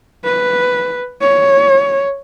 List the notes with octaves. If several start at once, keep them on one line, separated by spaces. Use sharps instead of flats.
B4
C#5